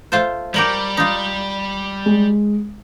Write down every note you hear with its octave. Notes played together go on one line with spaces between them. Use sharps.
A3 F4 C5
G3 G4 A#4 C#5
D#4 F4
G#3